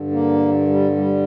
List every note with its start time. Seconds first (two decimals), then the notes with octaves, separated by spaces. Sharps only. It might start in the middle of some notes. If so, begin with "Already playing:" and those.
Already playing: G2 D3
0.11 A#3
0.68 G3
0.96 G3